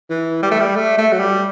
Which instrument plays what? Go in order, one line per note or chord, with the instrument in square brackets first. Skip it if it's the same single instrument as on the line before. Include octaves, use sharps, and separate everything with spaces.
[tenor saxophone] E3
G3
A3
G3
A3
A3
F#3
G3